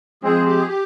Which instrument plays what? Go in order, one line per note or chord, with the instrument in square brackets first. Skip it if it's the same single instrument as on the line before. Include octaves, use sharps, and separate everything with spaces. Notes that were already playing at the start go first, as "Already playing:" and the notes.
[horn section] F3 G#3 C4 [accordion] G#4
[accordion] G4
G#4
G4